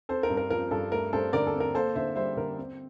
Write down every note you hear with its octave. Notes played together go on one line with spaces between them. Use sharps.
C4 A4 C5
A#4
G2
A#4
F3 A#4
G2 A4
A3 A#4
G2 A4 C5
D3 A#4 D5
A4
C4
A#4
A#3 A4 C5
D3 C5 E5
G3 C5 E5
D3 A#4
C4